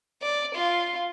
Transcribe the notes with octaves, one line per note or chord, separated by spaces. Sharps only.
D5
F4